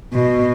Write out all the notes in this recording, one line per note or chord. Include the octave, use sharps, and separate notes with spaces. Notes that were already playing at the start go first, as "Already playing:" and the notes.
B2